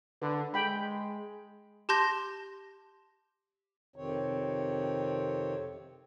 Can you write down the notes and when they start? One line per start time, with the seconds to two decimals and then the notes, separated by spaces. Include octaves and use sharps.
0.22 D3 B4
0.54 G#3 G5 B5
1.89 G4 A5 C6 G6 A#6
3.96 F2 C3 D#3 C4 C#5